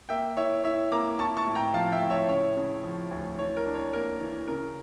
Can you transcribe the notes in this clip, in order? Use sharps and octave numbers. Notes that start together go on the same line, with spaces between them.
A#3 E5 G5
E4 C#5 E5
E4 C#5 E5
A#3 A#5 D6
E4 A5 C#6
A5 C#6
A2
G5 A#5
F3 F5 A5
E5 G5
A2
C#5 E5
C#3 C#5
C#3
F3
D2
E3 C#5
A#4
D4
C#5
A#3 A#4
E3
C#3 A#4